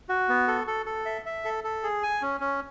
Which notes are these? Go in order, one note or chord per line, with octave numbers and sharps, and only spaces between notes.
F#4
B3
A4
A4
A4
E5
E5
A4
A4
G#4
G#5
C#4
C#4